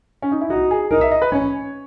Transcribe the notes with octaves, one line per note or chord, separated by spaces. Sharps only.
C#4
D#4
E4
D#4 F#4
G#4
D#4 A#4
E5
D#5
B4
C#4 C#5